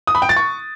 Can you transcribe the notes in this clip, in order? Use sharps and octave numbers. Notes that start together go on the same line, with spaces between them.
D#6
B5
G5
A6
C#6